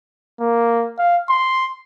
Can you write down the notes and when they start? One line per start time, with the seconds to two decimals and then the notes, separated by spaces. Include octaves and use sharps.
0.40 A#3
0.98 F5
1.29 C6